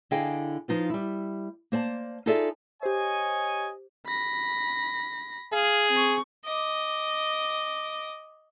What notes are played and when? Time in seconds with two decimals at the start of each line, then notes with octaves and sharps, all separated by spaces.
0.11 D3 E4 G#4 D#5 F5 G5
0.68 F3 D#4 F4 B4
0.90 G3 E4
1.72 A#3 C5 D5 A5
2.26 D#4 F4 G#4 A4 D5 E5
2.83 G4 C5 C#5 D#5 G#5
4.06 B5 A#6
5.53 G#4 F5
5.92 C4 C#6
6.45 D#5 D6